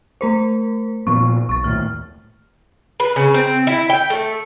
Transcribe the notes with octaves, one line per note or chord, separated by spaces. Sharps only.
A3 A#4 C5
A#2 F3 B3 C#6
B1 C#6 A6
D#2 A2 F6
B4
C#3
C4
E4
G5
A3